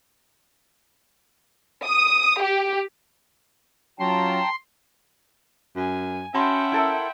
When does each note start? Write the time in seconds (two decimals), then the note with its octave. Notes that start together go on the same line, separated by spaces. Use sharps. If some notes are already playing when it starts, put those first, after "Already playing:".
1.84 D#6
2.42 G4
4.00 F#3 C#4 F4 G5 A5 A#5 C6
5.76 F#2 G#5
6.35 C#4 F#4 E5 F#5 G5 A5 B5 C6
6.72 E4 A4 A#4